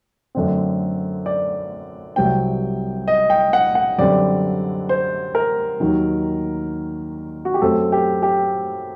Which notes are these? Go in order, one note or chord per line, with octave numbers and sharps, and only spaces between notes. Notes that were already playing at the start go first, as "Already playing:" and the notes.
F#2 D3 A3 C4
D5
C2 C3 F#3 C4 G5
D#5
G5
F#5
F#5
F#2 D3 G3 C4 D5
C5
A#4
D#2 D#3 F#3
F#4
G4
F#2 F#3 A3 C4 A4
G4
G4